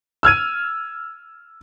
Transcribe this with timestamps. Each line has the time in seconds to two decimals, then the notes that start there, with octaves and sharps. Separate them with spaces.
0.23 E6 F6 G#6 D#7